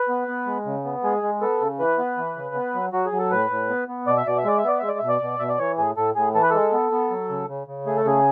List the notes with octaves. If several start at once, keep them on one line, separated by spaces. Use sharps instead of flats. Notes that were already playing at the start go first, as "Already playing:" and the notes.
Already playing: B4
B3
B3
G#3
C#3
B3
G#3 G#4
G#3
B3 A4
C#3
E3 B4
B3
E3
C#3
B3
F#3
F#3 F#4
G#4
F#3
A4
A2 B4
A2
B3
B3
B2 D5
E5
B2 D5
E5
G#3 D5
E5
B3 D5
G#3 E5
D5
B2 E5
D5
B2
B2 E5
D5
E3 C#5
A2 G#4
A2 A4
A2 G#4
E3 A4
B4
G#3 A4
B3
B3
F#3
C#3
C#3
C#3
A3 G#4
A4
C#3 G#4